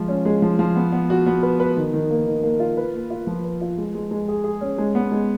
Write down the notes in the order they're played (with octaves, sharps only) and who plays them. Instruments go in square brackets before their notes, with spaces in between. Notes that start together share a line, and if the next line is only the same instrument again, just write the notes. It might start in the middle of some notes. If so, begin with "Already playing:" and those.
Already playing: [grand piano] F3 G#3 F4
C#4
G#3
F3
F3
B3
B3
F#4
B3
B4
B4
D#3
D#3
A#3
D#3
A#3
F4
B4
A#3
F4
F3
B4
F4
G#3
G#3
G#3
G#4
G#4
C#4
G#3
B3
G#3